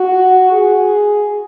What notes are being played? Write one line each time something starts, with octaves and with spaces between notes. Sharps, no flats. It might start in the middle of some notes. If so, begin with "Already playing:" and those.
Already playing: F#4
G#4